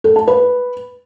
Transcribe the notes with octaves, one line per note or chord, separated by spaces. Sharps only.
A4
A5
B4